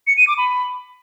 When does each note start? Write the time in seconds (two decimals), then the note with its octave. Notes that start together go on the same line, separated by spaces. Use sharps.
0.07 C#7
0.17 D#7
0.28 D6
0.38 B5